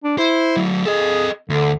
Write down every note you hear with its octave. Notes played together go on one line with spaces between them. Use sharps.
D4
E4 C5
F#3 A3
G#4 A4 D#5
D2 D3